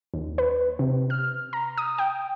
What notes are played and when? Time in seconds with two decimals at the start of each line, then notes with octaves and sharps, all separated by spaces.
0.14 D#2
0.38 B4
0.79 C3
1.10 F6
1.53 A#5
1.78 D#6
1.98 G5